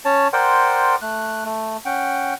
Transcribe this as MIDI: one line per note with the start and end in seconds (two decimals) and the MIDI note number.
0.05 0.28 61
0.05 0.28 73
0.05 0.28 81
0.33 0.96 70
0.33 0.96 72
0.33 0.96 74
0.33 0.96 78
0.33 0.96 79
0.33 0.96 84
1.02 1.44 57
1.02 1.44 90
1.45 1.77 57
1.85 2.34 61
1.85 2.34 78
1.85 2.34 79